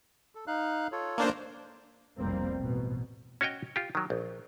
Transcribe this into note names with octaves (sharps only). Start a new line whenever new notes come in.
A4
D#4 F5 F#6
F4 A4 C#5
A#3 D4 C5
F1 B1 G3 A#3 C4
A1 B2
C#4 F#4 C#5 D#5 G5
F4 G4
D#3 F#3
A#1